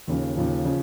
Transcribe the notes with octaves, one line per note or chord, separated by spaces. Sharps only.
D#2 C#3 F3
D#2 C#3 F3
C#3 F3